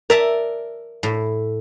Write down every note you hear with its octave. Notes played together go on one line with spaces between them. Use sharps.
A#4 D5 E5 A5
A2